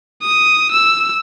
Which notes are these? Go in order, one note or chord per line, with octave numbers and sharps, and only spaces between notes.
D#6
E6